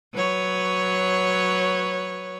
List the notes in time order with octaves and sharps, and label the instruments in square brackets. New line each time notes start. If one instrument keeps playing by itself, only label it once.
[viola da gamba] F#3 B4 C#5